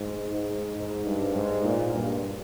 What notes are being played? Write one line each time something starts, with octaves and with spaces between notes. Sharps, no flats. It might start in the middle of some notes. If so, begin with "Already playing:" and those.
Already playing: G#2
G#2
G#2
G2
G#2
A#2
G2